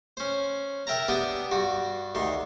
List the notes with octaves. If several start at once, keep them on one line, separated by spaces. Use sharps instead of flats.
C#4 C5
A#4 E5 G5 A5 A#5
B3 D4 G4 G5 D#6
G2 F#4
D2 D#3 C6